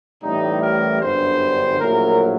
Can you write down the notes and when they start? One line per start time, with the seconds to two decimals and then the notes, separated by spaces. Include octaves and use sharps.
0.23 A1 A2 G3 D#4
0.62 A#4
1.02 G1 F#2 D3 G3 C5
1.79 A#1 A2 F#3 A#4